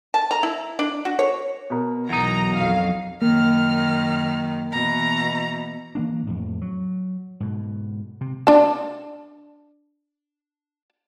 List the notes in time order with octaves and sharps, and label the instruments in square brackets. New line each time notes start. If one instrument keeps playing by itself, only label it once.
[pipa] A5
A#5
E4
D4
F#4
C#5
[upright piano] B2 A#4
[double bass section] B1 [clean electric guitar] E2 D#4 [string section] A#5
[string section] F2 F#3 F5
[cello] F#2 D#3 [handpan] A#3 [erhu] F6
[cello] B2 E3 [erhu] A#5
[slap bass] E3 A#3 D4
F2 A2
F#3
G#2 B2
C3
[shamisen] D4 A5